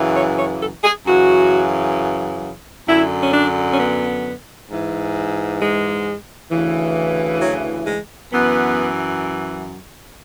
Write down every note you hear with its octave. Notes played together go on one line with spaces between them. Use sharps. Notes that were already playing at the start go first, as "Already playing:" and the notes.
Already playing: F#2 C#3 E3
C#5
C#5
A4
G#4
F#2 C#3 E3 F#4
F#2 D3 E4
C#4
D4
C#4
B3
G#2 E3
G#3
D2 C#3 E3
F#3
G#3
F#2 E3 B3